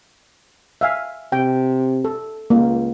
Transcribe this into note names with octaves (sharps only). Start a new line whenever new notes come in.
E5 F5 G#5
C3 G5
A4
C#2 A#3